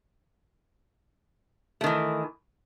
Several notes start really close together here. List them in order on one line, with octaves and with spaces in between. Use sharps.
A3 D#3 E3